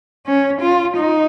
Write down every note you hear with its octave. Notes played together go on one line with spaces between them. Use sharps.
C#4
F4
D#4